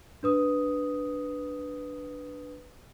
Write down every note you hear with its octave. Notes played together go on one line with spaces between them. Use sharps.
D4 B4 D#6